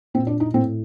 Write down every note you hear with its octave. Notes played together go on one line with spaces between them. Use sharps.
A#2 C4
D4
D#4
A2 C4